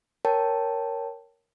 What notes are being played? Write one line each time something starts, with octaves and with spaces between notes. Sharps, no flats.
A#4 C#5 G5 A5